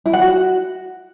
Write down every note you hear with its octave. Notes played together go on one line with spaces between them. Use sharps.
E4
F#5
F#4